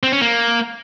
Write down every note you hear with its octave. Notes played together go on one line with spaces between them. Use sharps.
C4
C#4
A#3